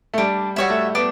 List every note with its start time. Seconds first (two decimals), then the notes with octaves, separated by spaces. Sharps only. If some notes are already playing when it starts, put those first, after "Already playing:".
0.14 A3
0.18 G3 D4
0.56 G3 F#4 C#5 E5
0.70 A3
0.95 B3 D4